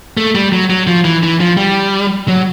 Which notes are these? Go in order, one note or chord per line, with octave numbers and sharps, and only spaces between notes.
A3
G3
F#3
F#3
F3
E3
E3
F3
G3
F#3